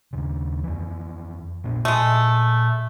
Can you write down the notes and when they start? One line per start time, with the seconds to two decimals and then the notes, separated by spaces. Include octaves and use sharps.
0.13 D#2 C#3
0.63 F2 E3
1.64 A#2 B3 D4
1.85 A#2 G#3 A3